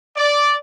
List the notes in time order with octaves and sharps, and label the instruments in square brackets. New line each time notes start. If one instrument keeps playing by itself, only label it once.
[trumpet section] D5